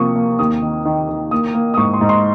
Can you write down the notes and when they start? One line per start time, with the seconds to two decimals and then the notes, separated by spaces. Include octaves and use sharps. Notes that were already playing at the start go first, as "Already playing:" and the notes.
Already playing: C3 F3 A#3 C#6 D#6
0.16 A#3
0.39 D#2 D#6
0.62 D#3
0.85 D#3
1.09 D#3
1.31 A#3 D#6
1.54 A#3
1.74 D#6
1.78 G#2 C#6
1.94 C6
2.01 G#2
2.09 C6